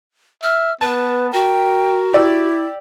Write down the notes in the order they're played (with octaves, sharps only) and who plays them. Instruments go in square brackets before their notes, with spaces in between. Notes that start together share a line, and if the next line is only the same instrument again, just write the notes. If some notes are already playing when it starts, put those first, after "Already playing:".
[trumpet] E5 [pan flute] F6
[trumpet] B3 [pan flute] B4 [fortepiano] A5
[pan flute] F#4 [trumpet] A#4 [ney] G5
[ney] E4 [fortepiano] G4 D5 E6